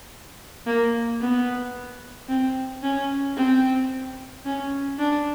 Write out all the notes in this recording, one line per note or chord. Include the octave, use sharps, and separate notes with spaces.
A#3
B3
C4
C#4
C4
C#4
D4